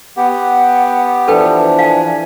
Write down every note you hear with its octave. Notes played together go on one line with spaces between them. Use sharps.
B3 G4 F#5
E3 F3 D4 A4 B4 G5
F5 G#5